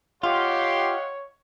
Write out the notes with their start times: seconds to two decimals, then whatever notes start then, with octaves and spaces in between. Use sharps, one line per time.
0.23 F4 G4 C#5 D#5 F5 F#5 C6